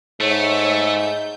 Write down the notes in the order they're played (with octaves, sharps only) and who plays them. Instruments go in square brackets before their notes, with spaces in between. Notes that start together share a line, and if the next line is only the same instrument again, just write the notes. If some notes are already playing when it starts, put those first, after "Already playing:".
[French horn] G#2 [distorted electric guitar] A3 [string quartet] C#5 E5
[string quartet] G6